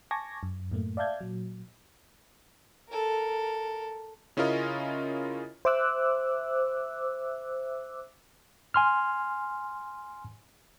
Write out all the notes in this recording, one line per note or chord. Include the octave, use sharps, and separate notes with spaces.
G#5 A5 C#6 D6 G#6 A#6
F#2
F#2 A2 A3 A#3
D5 E5 F5 A5 G6 G#6
A#2 F#3
A4 A#4
C#3 C#4 E4 F4 A#4 D#5
C5 E5 D6 E6 F#6
G#5 C6 F6